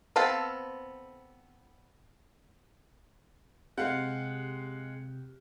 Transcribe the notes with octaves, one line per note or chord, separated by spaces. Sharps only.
B3 C4 A4 F5 A5
C3 G#3 G4 F5 F#5